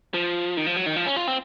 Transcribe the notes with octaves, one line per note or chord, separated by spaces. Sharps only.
F3
D#3
F3
F#3
D#3
F3
C#4
F4
C4